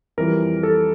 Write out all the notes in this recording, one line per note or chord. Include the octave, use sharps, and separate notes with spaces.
F2 E3 G3 A#4
A4